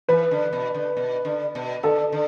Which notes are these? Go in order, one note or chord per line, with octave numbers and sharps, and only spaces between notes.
E3 B4
D3
B2
D3
B2
D3
B2
D3 A4
D3